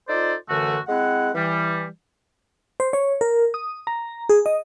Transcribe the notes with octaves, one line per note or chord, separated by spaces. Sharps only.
D#4 F4 A4 C5 D5
F#2 D3 E3 A3 F#4
G#3 C4 E4 F#5
E3 G3
C5
C#5
A#4
D#6
A#5
G#4
D#5